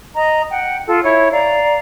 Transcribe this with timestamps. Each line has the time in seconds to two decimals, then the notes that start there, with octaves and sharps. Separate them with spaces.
0.16 D#5 A#5
0.50 F#5 G5
0.87 F4 A4
1.03 E4 C#5
1.32 D5 F5 A#5